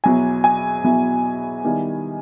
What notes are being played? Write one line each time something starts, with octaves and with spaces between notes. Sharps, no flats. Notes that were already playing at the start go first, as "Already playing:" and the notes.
E2 B2 F#3 B3 E4 G#5
G#5
E2 B2 F#3 B3 E4
D#3 G3 B3 E4